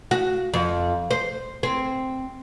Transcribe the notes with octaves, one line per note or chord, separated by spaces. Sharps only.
F#4
F2
C5
C4